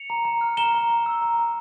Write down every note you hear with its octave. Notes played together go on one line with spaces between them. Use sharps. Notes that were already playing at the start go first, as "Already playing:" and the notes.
Already playing: C#7 F7
A#5
A#5
F6
A#5 E7 G7
A#5
A#5
E6
A#5
A#5